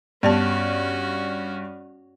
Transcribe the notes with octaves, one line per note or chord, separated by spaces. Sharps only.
G2 B3 C#4 F#4 D5 A5